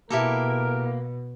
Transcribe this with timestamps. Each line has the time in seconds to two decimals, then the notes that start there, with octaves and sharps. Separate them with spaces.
0.10 B2 A#3 E4 G4 A4 A#4